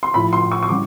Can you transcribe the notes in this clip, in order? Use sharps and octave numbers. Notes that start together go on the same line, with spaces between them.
C6
A2 F3 B5
C6
C#6
C#6
C#3 E3 G3 D6